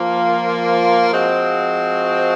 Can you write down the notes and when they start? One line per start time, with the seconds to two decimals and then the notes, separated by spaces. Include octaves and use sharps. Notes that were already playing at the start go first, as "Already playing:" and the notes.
Already playing: F3 A#3 F4
1.09 F3 G#3 C4 F#4